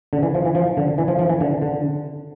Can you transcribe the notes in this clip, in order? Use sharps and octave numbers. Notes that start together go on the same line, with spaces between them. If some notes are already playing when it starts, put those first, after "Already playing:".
D3
E3
F3
E3
F3
D3
E3
F3
F3
E3
D3
D3